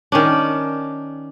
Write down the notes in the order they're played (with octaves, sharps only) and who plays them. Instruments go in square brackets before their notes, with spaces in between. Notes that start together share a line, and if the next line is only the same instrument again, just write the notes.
[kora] D#3 C#4 D4